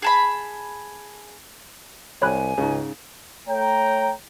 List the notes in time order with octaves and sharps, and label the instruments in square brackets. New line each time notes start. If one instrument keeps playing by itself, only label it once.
[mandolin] G#4 A5 B5
[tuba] C2 [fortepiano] G4 [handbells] C#5 B5 F#6 [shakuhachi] G#5
[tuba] C#2 [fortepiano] G#2 C#3
[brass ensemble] A3 C#5 G5 A#5